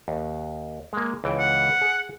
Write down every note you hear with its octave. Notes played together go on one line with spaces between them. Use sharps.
D#2
G#3 A#3
C#2 E3 G5
F#5
G#4